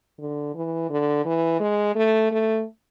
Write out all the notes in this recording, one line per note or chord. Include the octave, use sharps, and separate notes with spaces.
D3
E3
D3
E3
G#3
A3
A3